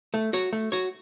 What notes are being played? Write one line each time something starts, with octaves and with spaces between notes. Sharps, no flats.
A3
F#4 C#5
A3
F#4 C#5